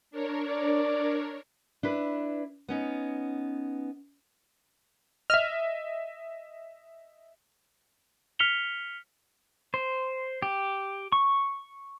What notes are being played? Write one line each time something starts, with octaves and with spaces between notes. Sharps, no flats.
D4 A#4 C#5
D5
D4 E4 B4
B3 C#4 D#4
D#5 E5 F6
F6 B6 C#7 F7 G7
C5
G4
C#6